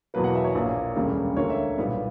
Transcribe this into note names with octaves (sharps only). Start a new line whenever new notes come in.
E2 B2 F#3 A#3 B4
F#5
E5
C#5
A#1 A#2 A#3
E1 D2 C#3 G3 A#3
D2 D3 A#3 C#5
E5
B1 A#2 G3 B3